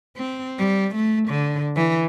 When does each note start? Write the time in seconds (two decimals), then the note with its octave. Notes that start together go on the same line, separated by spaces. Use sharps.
0.16 C4
0.59 G3
0.95 A3
1.29 D3
1.76 E3